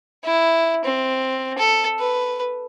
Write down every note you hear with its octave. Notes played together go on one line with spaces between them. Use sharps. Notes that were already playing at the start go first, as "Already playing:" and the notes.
E4
C4
A4
B4